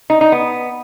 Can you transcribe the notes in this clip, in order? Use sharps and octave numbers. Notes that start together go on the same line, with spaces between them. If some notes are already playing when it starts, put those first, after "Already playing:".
D#4
D#4
B3